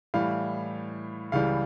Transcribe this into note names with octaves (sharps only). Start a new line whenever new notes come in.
A2 E3 G3 F5
C#2 C#3 E3 G3 F5